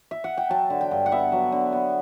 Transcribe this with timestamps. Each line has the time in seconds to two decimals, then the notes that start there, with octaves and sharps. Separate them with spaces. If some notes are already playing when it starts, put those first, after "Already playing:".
Already playing: D5
0.11 E5
0.24 F#5
0.37 G5
0.49 F#3 A5
0.70 D3
0.81 G5
0.91 G2
1.06 F#5
1.12 B3 E5
1.32 F#3
1.52 D3
1.73 B3